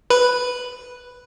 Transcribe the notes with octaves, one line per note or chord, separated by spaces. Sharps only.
B4